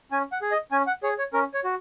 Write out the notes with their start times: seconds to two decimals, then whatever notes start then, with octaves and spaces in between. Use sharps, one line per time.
0.12 C#4 G#5
0.32 F#5
0.42 G#4
0.51 D#5
0.72 C#4 G#5
0.87 F#5
1.03 G#4 C#5
1.18 C#5
1.33 C#4 A#4
1.54 C#5
1.64 F#4